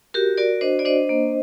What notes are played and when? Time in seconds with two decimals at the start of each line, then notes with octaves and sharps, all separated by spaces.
0.14 F#4 G4 A#4
0.37 F#4 A#4 D5
0.61 D4 C5 D#5
0.79 D5
0.85 D4 C5 D#5
1.09 A#3